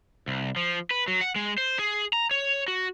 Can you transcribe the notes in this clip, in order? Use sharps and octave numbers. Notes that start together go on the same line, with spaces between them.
C2
F3
B4
F#3
F#5
G#3
C5
G#4
A#5
C#5
F#4